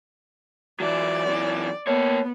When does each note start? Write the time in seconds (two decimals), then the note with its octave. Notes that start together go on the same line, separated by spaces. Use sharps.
0.80 E3 F#3 D5
1.26 F#2 E3
1.87 A#3 B3 C#5